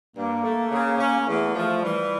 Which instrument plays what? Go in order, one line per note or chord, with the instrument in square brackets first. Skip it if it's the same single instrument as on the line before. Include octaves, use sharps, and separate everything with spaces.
[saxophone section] G2 [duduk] A#3
[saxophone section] A3
C#3
C#4
[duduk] A#3
[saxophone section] E2 [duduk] A3
[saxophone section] F3 [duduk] A3
[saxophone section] E3 [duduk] G3